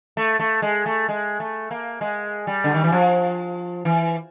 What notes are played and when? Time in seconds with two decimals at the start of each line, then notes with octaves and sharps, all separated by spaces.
0.17 A3
0.40 A3
0.62 G#3
0.86 A3
1.09 G#3
1.40 A3
1.71 A#3
2.01 G#3
2.47 G3
2.64 D3
2.74 D#3
2.84 E3
2.92 F3
3.85 E3